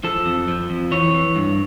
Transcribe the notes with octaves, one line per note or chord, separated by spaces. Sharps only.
F3 A4
F2
F3
F2
E3 C#5
E3
G2